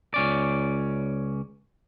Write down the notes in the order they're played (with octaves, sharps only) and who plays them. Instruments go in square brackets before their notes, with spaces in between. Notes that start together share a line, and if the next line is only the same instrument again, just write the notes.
[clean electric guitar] C#2 C#4 D5